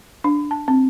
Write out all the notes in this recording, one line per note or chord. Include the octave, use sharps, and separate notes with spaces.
D4
A5
C4